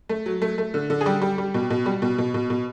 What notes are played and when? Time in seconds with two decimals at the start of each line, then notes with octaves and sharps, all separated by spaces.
0.09 A3
0.26 F#3
0.42 A3
0.58 A3
0.74 D3
0.90 D3
1.01 G#4
1.06 G3 G4
1.22 G3
1.38 G3
1.54 B2
1.70 B2
1.86 G3
2.02 B2
2.18 B2
2.34 B2
2.50 B2